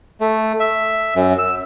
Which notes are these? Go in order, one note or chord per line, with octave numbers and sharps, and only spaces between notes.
A3
E5
F#2
E6